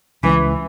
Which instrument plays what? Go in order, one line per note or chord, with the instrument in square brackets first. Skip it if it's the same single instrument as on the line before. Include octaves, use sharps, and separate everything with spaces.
[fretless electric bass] C#2 [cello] E3